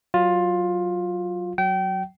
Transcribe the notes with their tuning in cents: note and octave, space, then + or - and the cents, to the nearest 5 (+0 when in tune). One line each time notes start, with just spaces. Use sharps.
F#3 +0 F4 +15
F#3 +0 G5 -30